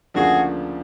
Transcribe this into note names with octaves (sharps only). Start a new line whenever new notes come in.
D2 C#3 F3 A#3 D4 F#4 G#4